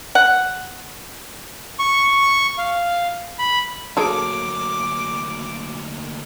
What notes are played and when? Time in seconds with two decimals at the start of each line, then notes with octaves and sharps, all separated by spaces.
0.15 F#5
1.79 C#6
2.58 F5
3.39 B5
3.97 D2 F#3 A#3 G#4 A4 D6